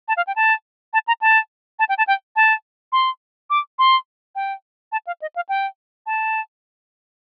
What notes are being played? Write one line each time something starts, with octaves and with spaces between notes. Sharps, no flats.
A5
F5
G5
A5
A5
A#5
A5
A5
G5
A5
G5
A5
C6
D6
C6
G5
A5
F5
D#5
F5
G5
A5